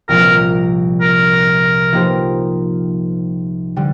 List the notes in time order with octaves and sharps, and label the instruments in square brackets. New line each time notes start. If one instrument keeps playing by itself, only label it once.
[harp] C2 A#2 F3 A#3 [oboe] A#4
[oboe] A#4
[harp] F3 A#3 D#4 G4 C5
D3 G3